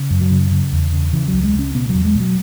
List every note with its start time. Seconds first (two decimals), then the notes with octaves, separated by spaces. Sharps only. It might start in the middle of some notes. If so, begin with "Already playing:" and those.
Already playing: C#3
0.10 F#2
0.21 F#3
0.31 C#3
0.52 C#3
0.72 E2
0.92 C#3
1.13 C#3 E3
1.28 F#3
1.33 C#2
1.43 G#3
1.54 C#3 C#4
1.74 B2 B3
1.90 E2 F#3
2.05 G#3
2.15 B2
2.20 F#3